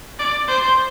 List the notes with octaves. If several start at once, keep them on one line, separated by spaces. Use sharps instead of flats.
D5
C5